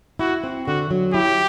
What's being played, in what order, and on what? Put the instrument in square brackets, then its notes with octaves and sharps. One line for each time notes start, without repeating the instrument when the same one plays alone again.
[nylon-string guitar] E4 [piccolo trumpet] F#4
[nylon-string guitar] C4
[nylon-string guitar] D3 [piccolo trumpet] F#4
[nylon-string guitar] F#3
[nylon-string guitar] E4 [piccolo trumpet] G4